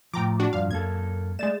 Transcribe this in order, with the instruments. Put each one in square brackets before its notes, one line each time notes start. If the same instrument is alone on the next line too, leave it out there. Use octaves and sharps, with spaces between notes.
[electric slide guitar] A2 F3 [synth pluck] G5 A#5 D6
[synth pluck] D4 F#4
[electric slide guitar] G2 F3 [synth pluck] F5
[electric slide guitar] F#2 A#3 A4 [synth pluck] G#6
[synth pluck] G#3 A6 E7 [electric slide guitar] A3 D5